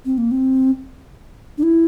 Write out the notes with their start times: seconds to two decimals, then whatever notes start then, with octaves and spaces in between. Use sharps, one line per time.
0.05 C4
0.18 A#3
0.31 C4
1.58 D4
1.63 E4